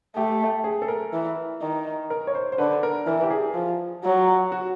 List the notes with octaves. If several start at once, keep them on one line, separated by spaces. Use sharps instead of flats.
A3 G4
G#4
A4
A#4
E3
D#3
A#4
C#5
C5
C5
D3 B4
A#4
E3 A#4
G4
G#4
F3
F#3
F#4